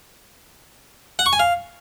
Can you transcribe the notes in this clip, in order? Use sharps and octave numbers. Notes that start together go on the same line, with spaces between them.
F#5
C#6
G#5
F5